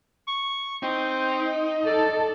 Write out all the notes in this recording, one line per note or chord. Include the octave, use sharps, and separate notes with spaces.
C#6
C4 D#4
D#5
A4 D5